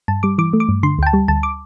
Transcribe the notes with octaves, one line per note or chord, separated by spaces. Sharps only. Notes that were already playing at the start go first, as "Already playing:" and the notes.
G2 A5
G3 D6
E3 D6
A3
D6
G2
D3 C6
D2 G5
A5
G3
D2 A5
D6